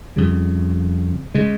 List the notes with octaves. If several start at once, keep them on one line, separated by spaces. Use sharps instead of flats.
F2 C#3 G3
C#3 G#3